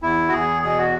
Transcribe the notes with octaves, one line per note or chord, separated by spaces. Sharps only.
E2 E4
F#4
E2 G#4
B2 G#4
F#4